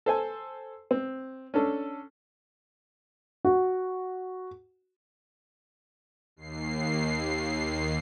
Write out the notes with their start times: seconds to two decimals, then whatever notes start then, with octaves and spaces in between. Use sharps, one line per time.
0.06 A4 C5 G#5 A5
0.91 C4
1.54 C#4 D4 A4
3.45 F#4
6.36 D#2 C7